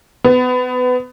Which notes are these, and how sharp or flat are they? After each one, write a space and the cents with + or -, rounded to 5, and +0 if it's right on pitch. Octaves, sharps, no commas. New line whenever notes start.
B3 +25